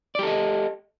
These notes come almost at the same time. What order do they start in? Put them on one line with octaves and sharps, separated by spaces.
D5 G4 A4 D#5